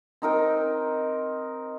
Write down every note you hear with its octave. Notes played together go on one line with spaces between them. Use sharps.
C4 D#4 A#4 G5